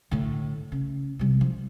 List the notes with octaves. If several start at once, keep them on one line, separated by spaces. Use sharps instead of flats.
A2 D3
C#3
C3 G3
F3